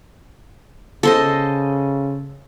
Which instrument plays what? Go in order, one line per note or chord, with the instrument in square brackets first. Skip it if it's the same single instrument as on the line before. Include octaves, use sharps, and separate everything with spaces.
[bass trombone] C#3 [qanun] A4 C5 D#5